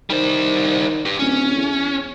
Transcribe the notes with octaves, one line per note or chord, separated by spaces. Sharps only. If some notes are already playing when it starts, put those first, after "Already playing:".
D#3 G3 C5
G4 B4
D1 C#4
E2